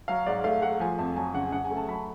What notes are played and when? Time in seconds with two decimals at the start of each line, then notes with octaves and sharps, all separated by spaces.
0.08 F#3 F5
0.26 G#2 D5
0.44 A3 F5
0.62 A3 F#5
0.80 F3 G#5
0.99 F2 A5
1.16 F#3 G#5
1.34 C#3 F#5
1.52 C#3 F#5
1.65 G#5
1.71 A3
1.77 A5
1.88 F#3 B5